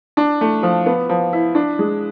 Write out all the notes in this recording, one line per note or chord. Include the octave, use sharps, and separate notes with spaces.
D4
A3
F3
B3
F3
E4
D4
G#3